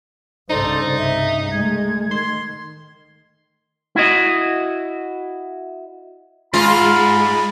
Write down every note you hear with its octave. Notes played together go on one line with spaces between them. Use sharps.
C2 G2 C#3 D#4 A4 C5 D5
E5
G#3 A3 G#6
D#3 C6
E4 F#4 D#5
G#2 G#3 F4 B5